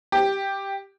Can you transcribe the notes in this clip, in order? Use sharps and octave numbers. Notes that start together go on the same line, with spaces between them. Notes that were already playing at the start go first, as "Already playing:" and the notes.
G4